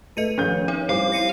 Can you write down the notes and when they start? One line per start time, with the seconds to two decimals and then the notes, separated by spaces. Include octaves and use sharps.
0.17 A3 B4 D#5 C#7 D#7
0.38 D#3 F3 C#4 G6
0.68 C4 D#4 C#5
0.89 G3 E4 C5 F5 D6
1.12 A#6 C#7 D#7